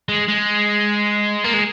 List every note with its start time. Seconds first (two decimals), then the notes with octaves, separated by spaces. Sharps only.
0.09 G#3
0.28 G#3
1.44 A#3
1.53 G#3